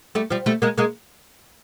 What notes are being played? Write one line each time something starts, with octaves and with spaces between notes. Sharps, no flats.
G3 A3
F3 G3
G3 A3
G#3 A#3
G#3 A#3